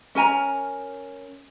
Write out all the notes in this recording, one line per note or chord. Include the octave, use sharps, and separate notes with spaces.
C#4 A#4 G#5 A#5